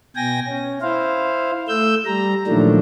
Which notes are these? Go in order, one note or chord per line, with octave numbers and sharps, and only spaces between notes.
B2 G5 G#5 A#6
C#4
E4 C5 F5
A3 E6 G6
G3 A#5
A#2 D#3 F3 F#3 A3 D4